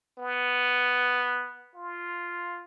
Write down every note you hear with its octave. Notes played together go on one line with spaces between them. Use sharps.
B3
F4